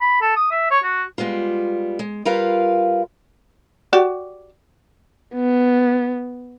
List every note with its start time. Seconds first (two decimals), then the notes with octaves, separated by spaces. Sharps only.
0.01 B5
0.22 A4
0.36 D#6
0.51 E5
0.71 C#5
0.84 F#4
1.18 G3 G#3 B3 F4
1.99 G#3
2.25 G3 F4 A#4 B4 F5
3.93 F#4 G4 D5
5.35 B3